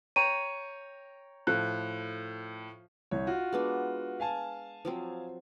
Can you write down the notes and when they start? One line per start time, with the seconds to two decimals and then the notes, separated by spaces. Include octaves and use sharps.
0.16 C#5 G5 A#5 D#7
1.47 A2 F3 F#6
3.11 C2 C#5
3.27 F4 F#4
3.53 G#3 B3 D4
4.20 F5 G#5 A5
4.85 F3 F#3 C4